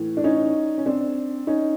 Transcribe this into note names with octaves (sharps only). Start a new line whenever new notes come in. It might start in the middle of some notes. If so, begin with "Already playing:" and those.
Already playing: A2 E3
D4
C#4 D#4
C#4
C4 D4
C#4 D#4